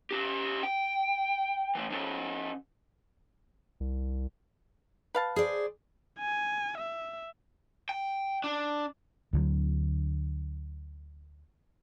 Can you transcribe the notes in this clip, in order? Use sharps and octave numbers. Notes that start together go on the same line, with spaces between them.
C#4 G4
G5
E3 A3
F3 C#4
C2
B4 F5 A5
G#4 C5 D5
G#5
E5
G5
D4
D2 D3 F3 F#3